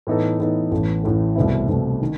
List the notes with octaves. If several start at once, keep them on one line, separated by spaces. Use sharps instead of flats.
A2 E3 B3 D#4 A4
A2 E3 B3 D#4 A4
A1 A2 E3 A3
A1 A2 E3 A3
C2 B2 A3 C4 E4
C2 B2 A3 C4 E4
D#3